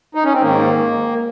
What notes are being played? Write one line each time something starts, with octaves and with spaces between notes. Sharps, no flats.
D#4
C#4
C4
G#2 D#3 A#3